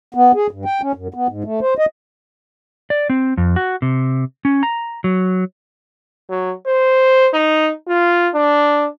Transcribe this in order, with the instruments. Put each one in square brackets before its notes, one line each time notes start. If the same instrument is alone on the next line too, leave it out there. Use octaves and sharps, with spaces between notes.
[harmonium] B3
G#4
G2
G5
C#4
F#2
B3
G#2
A3
C5
D#5
[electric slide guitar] D5
C4
F2
F#4
C3
C#4
A#5
F#3
[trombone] F#3
C5
D#4
F4
D4